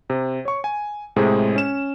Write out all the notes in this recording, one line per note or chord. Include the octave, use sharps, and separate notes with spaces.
C3
C#5 C#6
G#5
A2 C3 G#3 G#4
C#4 E7